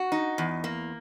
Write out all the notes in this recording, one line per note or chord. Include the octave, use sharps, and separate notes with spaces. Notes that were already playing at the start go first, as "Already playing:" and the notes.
Already playing: F#4
D#4
E2
A#3